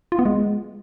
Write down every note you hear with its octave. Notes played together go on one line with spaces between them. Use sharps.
F4
B3
G#3